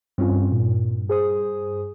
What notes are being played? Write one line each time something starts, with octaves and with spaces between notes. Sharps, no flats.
G2 C4 C#4 F4
A#2
G#4 C5 D#6